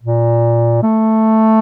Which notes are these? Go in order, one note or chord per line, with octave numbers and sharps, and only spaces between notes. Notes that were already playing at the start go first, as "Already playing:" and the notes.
A#2
A3